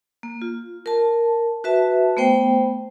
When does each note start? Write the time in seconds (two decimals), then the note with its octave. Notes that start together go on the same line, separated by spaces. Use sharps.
0.23 A#3
0.42 F4
0.86 A#4 A5
1.64 F#4 B4 E5 A5
2.17 A3 B3 C5 G5